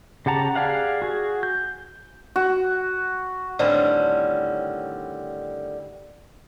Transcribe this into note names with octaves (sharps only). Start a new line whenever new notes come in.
C#3 G4 F#5 A5 A#5
G4 G#4 D5 F5 F#5
F#4 G#4
G6
F#4
A2 D3 D#3 G3 C4 C#4